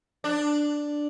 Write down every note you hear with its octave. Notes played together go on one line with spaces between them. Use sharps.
D4